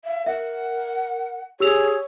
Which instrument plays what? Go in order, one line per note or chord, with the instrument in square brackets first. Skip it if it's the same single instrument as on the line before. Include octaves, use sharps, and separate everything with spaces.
[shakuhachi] E5 [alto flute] F5
[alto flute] A#4 [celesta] E5 [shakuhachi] F#5
[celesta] G4 E6 F7 [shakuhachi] G#4 [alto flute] C#5